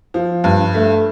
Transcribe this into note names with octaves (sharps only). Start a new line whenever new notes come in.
F3
G2
A3